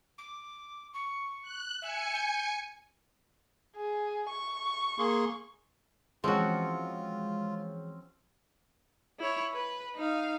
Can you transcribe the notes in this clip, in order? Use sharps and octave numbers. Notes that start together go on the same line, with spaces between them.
D6
C#6
F#6
E5 G#5 C#7
G6
G#4
C#6
A#3 G#4 C6
E3 F3 G#3 C4 C#4 F4 F#4
E4 C#5
B4
D#4 F5